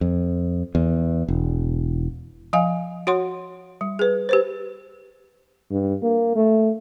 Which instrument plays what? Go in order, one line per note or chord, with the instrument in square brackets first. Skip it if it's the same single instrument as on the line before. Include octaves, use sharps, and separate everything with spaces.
[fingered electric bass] F2
E2
E1
[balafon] F3 D#5 F5 G#5
F#4 C#5 F#5 C6
G3
G#4 B4
G4 B4 C5
[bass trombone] G2
A#3
A3